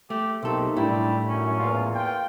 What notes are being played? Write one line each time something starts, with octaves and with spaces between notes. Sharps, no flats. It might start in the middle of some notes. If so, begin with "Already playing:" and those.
A3 G4
B1 A3 A#3 C4 D#4 G4 A4
A2 G3 D4 E4
F#2 C#4
E2 A#2 F4
F4 G5